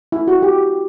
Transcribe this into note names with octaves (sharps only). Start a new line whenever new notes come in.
E4
F#4
G4